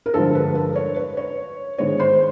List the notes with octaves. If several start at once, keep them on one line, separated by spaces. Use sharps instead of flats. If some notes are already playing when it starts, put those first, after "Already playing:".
A#4
G2 D3 F3 G#3 A4
B4
A#4
C#5
B4
C#5
G#2 D#3 G#3 B3 D4 C#5
C5